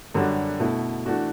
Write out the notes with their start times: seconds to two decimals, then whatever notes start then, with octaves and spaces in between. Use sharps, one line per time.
0.14 F#2 D3 G3 D4 F#4
0.60 B2 A3 E4
1.06 E3 A3 D4 F#4